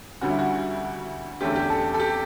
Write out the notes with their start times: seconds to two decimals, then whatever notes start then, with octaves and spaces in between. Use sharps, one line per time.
0.21 D2 D3 G3 C#4 F#4
0.30 E4
0.39 F#4
1.41 E2 D3 A3 C#4 G4
1.56 G4
1.70 A4
1.94 A4
2.00 G4